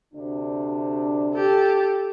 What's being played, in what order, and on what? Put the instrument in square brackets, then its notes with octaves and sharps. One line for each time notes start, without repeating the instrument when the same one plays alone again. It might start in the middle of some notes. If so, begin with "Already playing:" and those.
[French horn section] D2 C3 D4
[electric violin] G4 A4